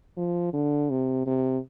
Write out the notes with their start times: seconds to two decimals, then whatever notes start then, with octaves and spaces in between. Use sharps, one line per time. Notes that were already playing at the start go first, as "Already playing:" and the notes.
0.17 F3
0.53 D3
0.90 C3
1.26 C3